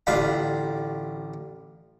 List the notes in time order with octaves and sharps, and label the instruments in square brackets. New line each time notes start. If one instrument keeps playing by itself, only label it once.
[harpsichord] A1 D3 G3 F4 B5